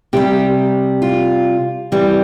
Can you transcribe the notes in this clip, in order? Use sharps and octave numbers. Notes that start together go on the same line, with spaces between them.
C3 G3 G4
F4
C3 E3 G3